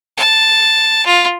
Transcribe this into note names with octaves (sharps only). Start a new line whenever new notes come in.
A5
F4